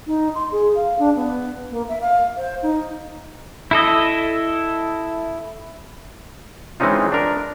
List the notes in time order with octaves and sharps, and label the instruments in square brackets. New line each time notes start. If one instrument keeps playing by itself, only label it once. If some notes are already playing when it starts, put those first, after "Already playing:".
[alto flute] D#4
C6
G#4
F5
D4
B3
A#3
E5
F5
C5
D#4
[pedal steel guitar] E4 A4 D#5
[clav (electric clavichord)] E3 G#3 C4 C#4 D#4 F4
D4 A#4